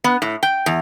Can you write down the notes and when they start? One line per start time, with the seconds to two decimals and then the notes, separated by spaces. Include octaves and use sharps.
0.04 B3
0.22 A2
0.43 G5
0.66 E2